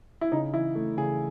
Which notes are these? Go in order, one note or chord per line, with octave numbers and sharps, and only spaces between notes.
E4
C#3 D#4
E3 E4
A3
C#3 G#4